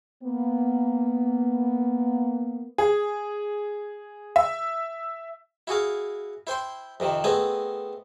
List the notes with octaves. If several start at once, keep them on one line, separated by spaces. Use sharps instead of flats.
A#3 B3
G#4
E5
E4 F#4 G#4 F5
E4 C5 G5 C6
F2 C3 D#3
A3 B3 C4 G#4 D#5